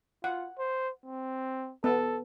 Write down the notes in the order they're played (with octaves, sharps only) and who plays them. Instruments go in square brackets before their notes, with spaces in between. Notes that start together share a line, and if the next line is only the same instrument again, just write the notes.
[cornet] F4 [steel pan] F#5
[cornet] C5
C4
[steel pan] B3 [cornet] A4